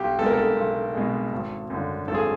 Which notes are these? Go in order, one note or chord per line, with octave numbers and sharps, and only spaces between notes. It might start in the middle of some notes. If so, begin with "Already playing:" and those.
Already playing: B1 G4
B2 G#3 A4
A#4
A4
B1
B2 G#3
G#1
F#2 D3
G#1 A4
G#4